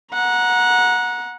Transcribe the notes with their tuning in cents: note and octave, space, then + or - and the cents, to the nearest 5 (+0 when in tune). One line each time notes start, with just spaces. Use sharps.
F#5 -15 A#5 +25